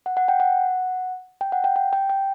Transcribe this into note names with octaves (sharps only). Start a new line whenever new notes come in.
F#5
F#5
G5
F#5
G5
F#5
G5
G5
G5
G5